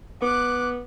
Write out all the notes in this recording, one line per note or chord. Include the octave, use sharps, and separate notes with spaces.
B3 D6 F#6